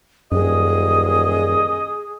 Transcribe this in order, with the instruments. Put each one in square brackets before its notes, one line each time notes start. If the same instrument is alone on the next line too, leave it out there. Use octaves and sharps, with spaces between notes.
[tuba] D#1 [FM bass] F#2 [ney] G#4 [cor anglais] D#5